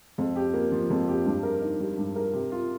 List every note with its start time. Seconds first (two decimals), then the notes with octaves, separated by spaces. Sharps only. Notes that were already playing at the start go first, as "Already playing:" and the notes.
0.18 F2
0.36 G4
0.54 A#3
0.72 F3
0.90 F2
1.08 G4
1.26 G2
1.43 A#4
1.61 D#4
1.80 G3
1.98 G2
2.16 A#4
2.33 C3
2.52 F4